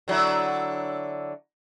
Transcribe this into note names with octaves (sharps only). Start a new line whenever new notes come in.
D3 F#3 E4